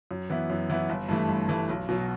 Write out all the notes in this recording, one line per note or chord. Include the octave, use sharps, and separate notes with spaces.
F#2
E3 B3 E4
F#2
E3 B3 E4
G1
G2 E3 A3
G1
G2 E3 A3
B1
B2 F#3